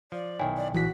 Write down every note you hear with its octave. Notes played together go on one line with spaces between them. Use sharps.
F3 D5
B1 D#3 E4 C#5 G5 G#5
D5
A#1 E3 F#4 B6